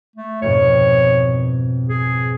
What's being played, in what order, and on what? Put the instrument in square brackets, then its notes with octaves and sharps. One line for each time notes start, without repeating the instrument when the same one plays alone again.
[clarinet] A3
[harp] F2 G#2 B2 [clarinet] C#5
[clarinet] G#4